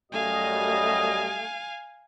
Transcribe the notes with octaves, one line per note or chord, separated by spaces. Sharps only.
F#2 G3 A3 D#5 F5 G#5